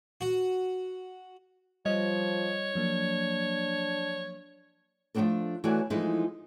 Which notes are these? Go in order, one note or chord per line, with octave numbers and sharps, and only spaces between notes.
F#4
F3 G3 C#5 D#5
F3 F#3 A#3 D4
F3 A3 A#3 C4 D4 A4
E3 A3 F#4 C#5 D5 G#5
E3 F3 G#3 A3 D#4 E4